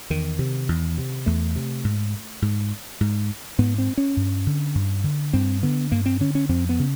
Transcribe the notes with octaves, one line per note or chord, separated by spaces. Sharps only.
E2 D#3
C3
E2
C3
E2 A3
C3
G#2
G#2
G#2
G#2 B3
C4
C#4
G2
D3
G2
D3
G2 C4
D3 B3
G2 A#3
C4
D3 C#4
C#4
F2 C4
B3
C#3